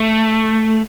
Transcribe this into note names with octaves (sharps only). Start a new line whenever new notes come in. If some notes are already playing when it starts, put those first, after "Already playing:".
Already playing: A3